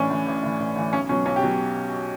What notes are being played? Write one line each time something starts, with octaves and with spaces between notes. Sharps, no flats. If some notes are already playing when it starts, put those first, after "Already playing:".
Already playing: A1 A2 E3 C#4 D4
A2 E3
A1
A2 E3
A1
A2 E3
B1 C#4
B2 F#3 C#4
B1 C#4
G4
B2 F#3